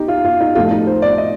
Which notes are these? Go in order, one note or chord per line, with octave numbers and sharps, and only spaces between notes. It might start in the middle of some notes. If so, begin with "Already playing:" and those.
Already playing: D#4 G4
F4
F4
D#4
A2 F3 A3 F4
D#4
C5
D5
D#5